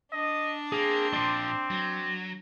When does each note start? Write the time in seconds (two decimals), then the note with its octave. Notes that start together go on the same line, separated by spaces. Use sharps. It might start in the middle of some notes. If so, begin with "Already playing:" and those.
0.12 D4 D#5
0.72 A#3 C4 G#4
1.13 A#2 F3 D5 C6
1.70 F#3